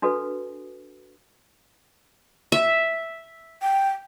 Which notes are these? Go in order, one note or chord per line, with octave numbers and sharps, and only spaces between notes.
D4 F#4 A4 B4
E5
G5